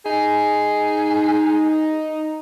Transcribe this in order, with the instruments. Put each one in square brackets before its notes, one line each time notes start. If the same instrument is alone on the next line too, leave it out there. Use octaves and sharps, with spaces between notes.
[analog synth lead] D#4 [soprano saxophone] G#4